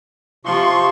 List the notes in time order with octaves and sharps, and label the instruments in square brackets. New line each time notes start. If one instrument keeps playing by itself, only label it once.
[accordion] C3 C6 C#6 [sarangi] F3